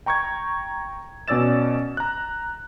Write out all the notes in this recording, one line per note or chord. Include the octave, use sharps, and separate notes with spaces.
G5 A#5 C#6 G6 G#6
B2 C#4 D5 E6 A6 E7
A#5 F#6